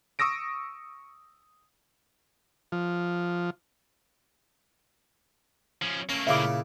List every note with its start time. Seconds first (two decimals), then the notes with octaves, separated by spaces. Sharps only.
0.19 C#6 D#6 E6 A#6 D7
2.72 F3
5.82 F3 C#4
6.09 A3 A#3 C#4
6.27 A#2 C#3 E4 E5 F5 D6